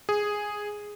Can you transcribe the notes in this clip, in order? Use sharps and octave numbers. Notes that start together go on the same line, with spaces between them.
G#4